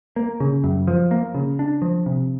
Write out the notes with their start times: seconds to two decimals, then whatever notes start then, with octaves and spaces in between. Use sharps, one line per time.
0.16 A#3
0.40 C#3
0.64 F#2
0.87 F3
1.11 A#3
1.34 C#3
1.59 D4
1.82 F3
2.06 C3